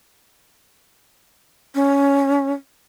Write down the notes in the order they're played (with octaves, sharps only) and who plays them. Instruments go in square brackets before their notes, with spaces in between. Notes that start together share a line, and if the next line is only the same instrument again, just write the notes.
[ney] C#4